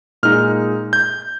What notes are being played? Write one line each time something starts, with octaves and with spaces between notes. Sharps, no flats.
A#2 G#3 D#4 F6
G6